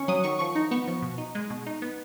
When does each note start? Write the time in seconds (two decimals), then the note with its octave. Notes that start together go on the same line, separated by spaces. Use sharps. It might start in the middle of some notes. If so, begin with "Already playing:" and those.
Already playing: D#3 C#4 C#6
0.08 F#3 D#6
0.24 D#3 C#6
0.39 F3 C#6
0.55 D#4
0.71 B3 C#6
0.88 F3
1.02 B2
1.18 D#4
1.35 G#3
1.50 B2
1.66 D#4
1.82 B3